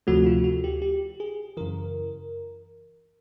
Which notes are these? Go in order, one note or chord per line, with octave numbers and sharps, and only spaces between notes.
D2 C3 F3 A3 F#4
F4
F#4
G4
G4
G#4
F#2 C#3 E3 A#4